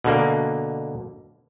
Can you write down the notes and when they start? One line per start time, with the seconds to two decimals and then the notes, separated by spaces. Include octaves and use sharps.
0.04 B2 D3 A#3